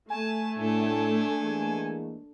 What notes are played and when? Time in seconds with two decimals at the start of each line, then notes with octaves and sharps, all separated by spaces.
0.10 A3 G#5 A5
0.57 A2 D4 A4
1.40 E3 G#3 A#3